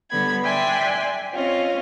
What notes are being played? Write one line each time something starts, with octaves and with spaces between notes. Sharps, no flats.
D3 G3 B3 B5 G#6
D5 E5 G5 G#5 C6 F#6
C4 C#4 F4 D#5